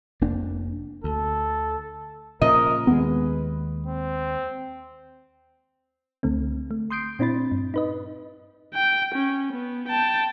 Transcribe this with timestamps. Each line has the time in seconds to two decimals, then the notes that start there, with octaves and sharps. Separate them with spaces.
0.21 F1 A#3 D4
1.04 D2 A4
2.41 A#2 C#3 F3 A#4 D#5
2.87 D#2 G#3 B3 B4
3.87 C4
6.23 C#2 D3 A3 C4
6.71 A3
6.90 C6 D#6 G6 C7 D7
7.19 A#2 C4 D4 E4 B5 A6
7.51 G2
7.74 D#4 B4 D#5
8.74 G5
9.15 C#4
9.53 B3
9.88 G5 A5